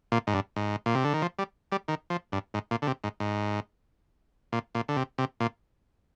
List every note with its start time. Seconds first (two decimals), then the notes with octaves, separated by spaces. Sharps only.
0.12 A#2
0.27 G#2
0.34 G2
0.56 G#2
0.86 A#2
0.95 C3
1.04 D3
1.14 D#3
1.22 F3
1.39 G3
1.72 G3
1.88 D#3
2.10 F3
2.32 G2
2.54 G#2
2.71 A#2
2.82 D3
2.87 C3
3.04 G#2
3.20 G#2
4.53 A#2
4.75 A#2
4.88 D3
4.97 C3
5.18 C3
5.40 A#2